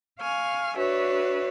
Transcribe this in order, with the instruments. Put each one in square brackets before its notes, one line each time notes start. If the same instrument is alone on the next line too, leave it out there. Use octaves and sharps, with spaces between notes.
[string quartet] F5 G#5 C#6 F6
D4 F#4 B4 C#5 E5